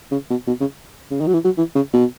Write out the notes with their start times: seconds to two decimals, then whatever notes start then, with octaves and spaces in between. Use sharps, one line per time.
0.12 C#3
0.30 B2
0.47 B2
0.60 C#3
1.11 C#3
1.20 D#3
1.27 F#3
1.33 E3
1.44 F#3
1.57 E3
1.75 C#3
1.93 B2